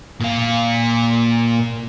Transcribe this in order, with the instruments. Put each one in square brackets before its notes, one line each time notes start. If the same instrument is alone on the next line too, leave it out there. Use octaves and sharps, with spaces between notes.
[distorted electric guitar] A#2 F5